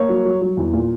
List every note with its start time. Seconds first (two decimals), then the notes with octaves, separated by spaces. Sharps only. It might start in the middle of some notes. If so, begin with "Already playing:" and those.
Already playing: A#3 C#5
0.09 F#3
0.25 F#3
0.41 F#3
0.57 E2
0.73 A#2